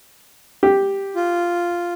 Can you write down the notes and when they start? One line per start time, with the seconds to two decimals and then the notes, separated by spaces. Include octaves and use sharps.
0.63 G4
1.15 F4